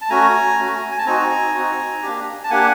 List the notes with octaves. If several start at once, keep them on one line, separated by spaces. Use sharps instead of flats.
A5
A3 C#4 F#4 G#5 A#5
A3 C#4 F#4
G#5
A5
C4 D#4 F#4 G#5 A#5
C4 D#4 F#4
A#3 D4 G4
A5
A#3 D4 G4 F#5 G#5